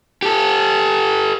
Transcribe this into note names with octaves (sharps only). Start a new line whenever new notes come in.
G4 A4